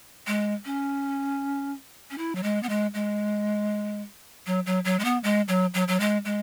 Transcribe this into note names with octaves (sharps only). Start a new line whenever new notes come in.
G#3
C#4
C#4
E4
F#3
G#3
B3
G#3
G#3
F#3
F#3
F#3
G#3
B3
G#3
F#3
F#3
F#3
G#3
G#3